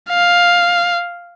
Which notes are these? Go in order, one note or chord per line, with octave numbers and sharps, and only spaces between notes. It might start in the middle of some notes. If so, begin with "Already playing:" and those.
F5